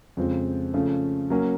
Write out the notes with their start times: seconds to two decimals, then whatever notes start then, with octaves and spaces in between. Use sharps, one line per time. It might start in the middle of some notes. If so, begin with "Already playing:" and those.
0.17 F2 C#3 F3 G#3 C4
0.74 C#3 F3 A3 C#4 F4
1.30 F#3 A#3 C#4